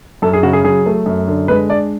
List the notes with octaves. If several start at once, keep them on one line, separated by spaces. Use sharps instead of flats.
F#2 A4
G#4
C#3 F#4
G#4
F#3 G#4
A3
F#2
D3
G#3 B4
D4 D5